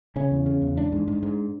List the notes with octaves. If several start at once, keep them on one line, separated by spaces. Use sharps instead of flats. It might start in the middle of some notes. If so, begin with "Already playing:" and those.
C#3 C#4
E2
C#3
E2
G#2 D4
G#2
G#2
G#2